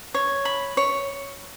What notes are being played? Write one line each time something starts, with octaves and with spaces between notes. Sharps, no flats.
C#5
B5
C#5